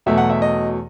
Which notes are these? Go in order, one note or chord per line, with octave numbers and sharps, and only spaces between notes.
E2 B2 F#3 A3 E5
F#5
E5
D#5